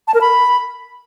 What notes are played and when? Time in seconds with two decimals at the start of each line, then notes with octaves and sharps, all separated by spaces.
0.08 A5
0.14 A#4
0.21 B5